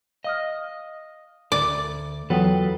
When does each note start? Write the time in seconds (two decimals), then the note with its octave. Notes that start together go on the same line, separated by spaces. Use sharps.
0.24 D#5 F5 D#6 F6
1.52 D2 D5
2.30 E2 F#3 F4 A4 B4 F#5 G5 D#6